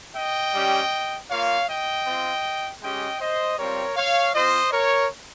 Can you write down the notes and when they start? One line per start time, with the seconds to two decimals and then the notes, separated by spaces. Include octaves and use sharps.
0.16 D#5 G5
0.54 G3 C#4 G4
1.30 A#3 F4 C#5 F5
1.68 D#5 G5
2.06 C4 F4
2.82 G#3 C#4 G4 D#5 G5
3.21 C5 D#5
3.58 G3 C4 F4 A#4 C#5
3.96 C#5 F5
4.34 C4 F4 C5 D#5
4.73 A#4 C#5